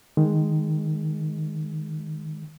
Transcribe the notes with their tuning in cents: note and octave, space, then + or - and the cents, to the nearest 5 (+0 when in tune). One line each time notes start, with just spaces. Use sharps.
D#3 +0 G#3 +0